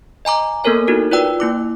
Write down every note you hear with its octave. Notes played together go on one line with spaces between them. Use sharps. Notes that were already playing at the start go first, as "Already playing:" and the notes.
D#5 G#5 A#5 D6
A#3 B3 A4 A#4 C#5 G#5
D#4 E4 F#4 A#4
F4 B4 D5 G5 E6
A#3 E4 D6